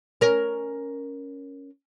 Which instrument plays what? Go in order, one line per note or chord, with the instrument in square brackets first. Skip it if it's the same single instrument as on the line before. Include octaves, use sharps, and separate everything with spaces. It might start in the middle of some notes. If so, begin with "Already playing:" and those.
[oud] C#4 A#4